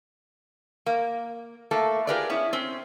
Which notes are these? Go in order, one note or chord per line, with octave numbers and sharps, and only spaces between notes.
A#3
A3 A#3 A4
F4 G4 G#4 A#4 B4 D5
B3 C#4 E4
C4 C#4